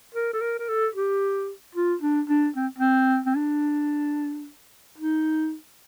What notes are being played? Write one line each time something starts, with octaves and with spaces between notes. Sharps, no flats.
A#4
A4
A#4
A#4
A4
G4
F4
D4
D4
C4
C4
C4
D4
D#4